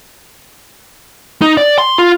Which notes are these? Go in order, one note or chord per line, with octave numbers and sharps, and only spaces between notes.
D#4
D5
C6
F4